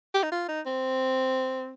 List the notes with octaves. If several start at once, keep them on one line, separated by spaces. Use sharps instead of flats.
G4
D#4
F4
D#4
C4